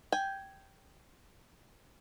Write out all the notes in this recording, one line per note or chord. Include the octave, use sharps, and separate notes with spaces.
G5 G#5